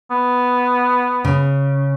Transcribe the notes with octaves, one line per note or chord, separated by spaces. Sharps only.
B3
C#3